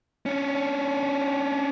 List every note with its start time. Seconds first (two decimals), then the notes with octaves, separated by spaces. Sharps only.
0.26 C#4 D4